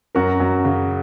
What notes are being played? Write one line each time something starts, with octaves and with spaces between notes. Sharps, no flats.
F#2 F#4 A#4
F#2
C#3